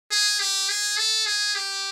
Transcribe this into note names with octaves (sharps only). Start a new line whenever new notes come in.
G#4
G4
G#4
A4
G#4
G4